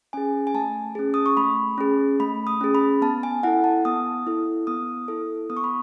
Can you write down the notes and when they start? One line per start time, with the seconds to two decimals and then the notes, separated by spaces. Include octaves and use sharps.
0.13 C#4 G#4 G#5
0.47 G#5
0.54 A3 A5
0.95 C#4 G#4
1.14 D#6
1.26 C#6
1.37 A3 B5
1.78 C#4 G#4
2.20 A3 B5
2.47 D#6
2.61 C#4 G#4
2.75 B5
3.02 B3 A5
3.23 G#5
3.43 E4 A4 F#5
3.64 A5
3.85 B3 D#6
4.27 E4 A4
4.67 B3 D#6
5.08 E4 A4
5.50 B3 D#6
5.57 C#6
5.64 B5